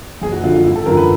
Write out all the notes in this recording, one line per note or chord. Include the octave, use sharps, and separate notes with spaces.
F#1 G#4
F#4
F2 D3 F4
F4
G#1 E4
A4
F#2 D3 F3 A#4
B4